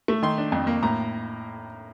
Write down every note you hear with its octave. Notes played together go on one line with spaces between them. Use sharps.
A3
D#3 C6
D4
F2
A#3
A2 A#5